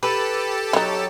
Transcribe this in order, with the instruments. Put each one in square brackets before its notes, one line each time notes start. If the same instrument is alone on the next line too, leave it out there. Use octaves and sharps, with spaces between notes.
[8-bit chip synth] G4 A4 A5 [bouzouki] B4
[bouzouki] F#3 C#5 [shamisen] D#4 E4